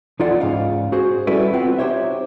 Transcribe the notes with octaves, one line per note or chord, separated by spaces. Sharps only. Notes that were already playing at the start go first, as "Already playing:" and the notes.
E2 D#4 F4 A4 D5 F#5
C#2 G#2 C#3 F5
F#4 G#4 C5
G3 C#4 E4 F#4 A4 B4
B3 C4 F4 F#4
D#4 G4 C5 C#5 E5